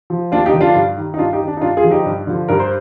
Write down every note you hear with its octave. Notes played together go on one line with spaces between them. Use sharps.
F3
D#2 D4 F4
D#4 G4
D3 F3
D4 F4
G2
D#3
D#4
G2 D4 F4
D#4 G4
D#3
D4
D#4
G2 D4 F4
F4 G#4
D3 F3
D#4 G4
G2
D3 F3
G2 A#4
C5